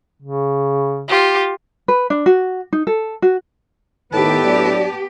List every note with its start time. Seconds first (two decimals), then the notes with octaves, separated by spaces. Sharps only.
0.22 C#3
1.08 F4 G4
1.88 B4
2.10 D4
2.26 F#4
2.73 D#4
2.87 A4
3.22 F#4
4.12 A2 D#3 B3 G4 A4 B4 A5
4.44 F#3 D4 D5